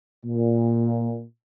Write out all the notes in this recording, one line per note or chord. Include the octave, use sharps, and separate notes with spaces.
A#2